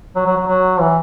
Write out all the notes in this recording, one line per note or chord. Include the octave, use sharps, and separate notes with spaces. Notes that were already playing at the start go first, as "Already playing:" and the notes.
F#3
F#3
F#3
F#3
E3